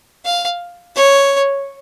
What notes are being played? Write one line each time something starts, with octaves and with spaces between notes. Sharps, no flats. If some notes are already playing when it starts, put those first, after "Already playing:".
F5
C#5